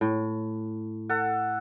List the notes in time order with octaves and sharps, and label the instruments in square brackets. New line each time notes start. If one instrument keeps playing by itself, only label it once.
[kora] A2
[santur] A4 F#5